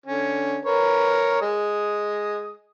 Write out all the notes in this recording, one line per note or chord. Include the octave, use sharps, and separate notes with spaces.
D3 C#4
A#4 B4 C#5
G#3 D#6